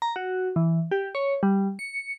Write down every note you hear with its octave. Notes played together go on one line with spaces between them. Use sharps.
A#5
F#4
E3
G4
C#5
G3
C#7